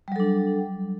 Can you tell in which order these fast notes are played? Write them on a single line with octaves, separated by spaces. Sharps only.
G3 F#3 A4 D4